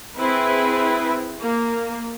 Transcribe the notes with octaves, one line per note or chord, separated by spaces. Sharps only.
C4 E4 G#4 B4
A#3